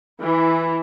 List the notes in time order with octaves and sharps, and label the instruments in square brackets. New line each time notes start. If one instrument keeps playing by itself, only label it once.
[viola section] E3 E4